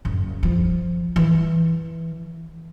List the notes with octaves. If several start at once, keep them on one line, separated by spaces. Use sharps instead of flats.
F#1
F3
E3